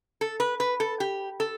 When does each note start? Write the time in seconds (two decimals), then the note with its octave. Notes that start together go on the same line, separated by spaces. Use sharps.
0.21 A4
0.40 B4
0.60 B4
0.80 A4
1.00 G4
1.40 A4